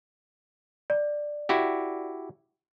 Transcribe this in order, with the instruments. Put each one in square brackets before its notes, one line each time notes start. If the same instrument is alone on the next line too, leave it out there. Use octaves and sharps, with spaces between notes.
[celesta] D5
[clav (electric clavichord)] E4 F#4 G4